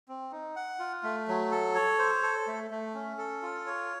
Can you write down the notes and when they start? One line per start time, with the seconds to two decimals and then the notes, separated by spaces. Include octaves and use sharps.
0.08 C4
0.32 D#4
0.56 F#5
0.79 F4
1.03 A3
1.28 F#3
1.51 A4
1.75 C#5
1.99 C5
2.23 A4
2.47 A3
2.71 A3
2.95 C#4
3.18 A4
3.42 F4
3.67 C#5